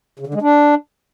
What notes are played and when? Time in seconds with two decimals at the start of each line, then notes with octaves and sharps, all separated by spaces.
0.20 C#3
0.27 D3
0.34 G#3
0.42 D4